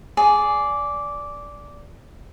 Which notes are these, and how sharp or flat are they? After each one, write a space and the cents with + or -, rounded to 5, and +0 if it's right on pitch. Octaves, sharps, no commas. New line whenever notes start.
G#4 +10 D5 -10